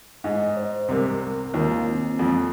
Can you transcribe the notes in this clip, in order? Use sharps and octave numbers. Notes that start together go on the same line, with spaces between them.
G#2 D#5
C5
C2 C3 A#4
D#2 D#3 F4
C4
F2 F3